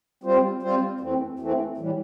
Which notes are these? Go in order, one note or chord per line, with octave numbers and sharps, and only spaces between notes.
G3 C4 F4 C5
G3 C4 F4 C5
E2 E3 A3 C4
E2 E3 A3 C4
A2 E3 G3